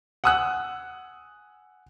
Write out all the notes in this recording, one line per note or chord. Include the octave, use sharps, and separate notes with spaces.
F#5 G#5 D#6 E6 F#6